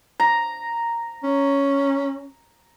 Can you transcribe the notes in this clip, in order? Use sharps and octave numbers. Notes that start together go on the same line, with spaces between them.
A#5
C#4